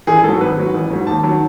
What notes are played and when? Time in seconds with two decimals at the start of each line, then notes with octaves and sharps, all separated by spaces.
0.07 A1 G#4
0.23 G#2 F#3 A4
0.41 G#1 B4
0.57 G#2 F#3
0.74 A1
0.90 G#2 F#3
1.07 D#2 A5
1.23 D#3 F#3